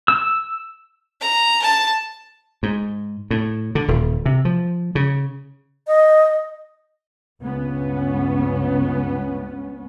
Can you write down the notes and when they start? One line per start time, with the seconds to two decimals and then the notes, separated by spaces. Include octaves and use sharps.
0.08 E6
1.21 A#5
1.62 A5
2.63 G#2
3.31 A2
3.75 D3
3.88 D#1
4.26 C3
4.45 F3
4.95 C#3
5.87 D#5
7.43 C#2 G2 B3 C#4